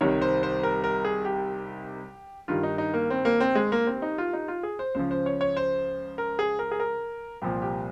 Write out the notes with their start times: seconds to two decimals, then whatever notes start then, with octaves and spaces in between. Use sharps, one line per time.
0.01 C2 C3 D#3 C#5
0.22 C5
0.43 C5
0.63 A#4
0.84 A#4
1.05 G#4
1.25 G4
2.48 G2 D#3 F4
2.63 D#4
2.78 D#4
2.94 A#3
3.10 C4
3.25 A#3
3.40 C4
3.55 G#3
3.72 A#3
3.87 C4
4.02 D#4
4.18 F4
4.33 D#4
4.48 F4
4.63 G#4
4.79 C5
4.95 C#2 C#3 F3 C5
5.11 C5
5.26 C#5
5.41 C#5
5.57 C5
6.18 A#4
6.39 G#4
6.59 A#4
6.71 G#4
6.80 A#4
7.42 C2 A#2 F3 G4
7.62 G4